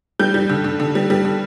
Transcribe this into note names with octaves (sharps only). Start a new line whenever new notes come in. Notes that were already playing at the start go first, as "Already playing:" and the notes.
G3 G6
G3
D3
D3
D3
G3
G3
D3